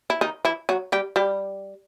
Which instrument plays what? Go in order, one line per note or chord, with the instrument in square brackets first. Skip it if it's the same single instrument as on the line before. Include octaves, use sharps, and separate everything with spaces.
[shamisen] E4
D#3 D#4
E3 E4
F#3 F#4
G3 G4
G3 G4